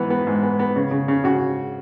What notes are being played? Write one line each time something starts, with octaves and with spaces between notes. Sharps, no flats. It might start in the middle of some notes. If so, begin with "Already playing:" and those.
Already playing: G#2 E3 B3
B3
G#2
B3
B3
C#3
C#3
C#3
C#3 F#4